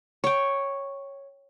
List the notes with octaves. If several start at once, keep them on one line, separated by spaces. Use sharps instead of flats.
C#5 G5